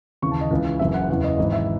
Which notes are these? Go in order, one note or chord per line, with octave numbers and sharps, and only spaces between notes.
D#2 C#3 E3 C#6
A5
D#5
C#2 C#3 E3
F#1 F#2 E3 E5
F#5
F#1 E2 C#3 E3 F#5
D#5
G#1 G#2 E3 D#5
E5